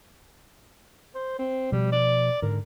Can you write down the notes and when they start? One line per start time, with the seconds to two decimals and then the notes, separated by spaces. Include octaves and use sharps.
1.15 C5
1.39 C4
1.72 B2 F3 G3
1.93 D5
2.42 G#2 D3 A#4